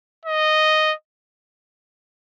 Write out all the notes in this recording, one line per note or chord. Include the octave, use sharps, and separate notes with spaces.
D#5